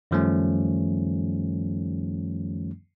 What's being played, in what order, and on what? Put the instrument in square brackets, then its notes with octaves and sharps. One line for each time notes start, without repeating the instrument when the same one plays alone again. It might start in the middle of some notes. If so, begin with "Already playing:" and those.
[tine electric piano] F#2 D#3 F3 G3 A3 C#4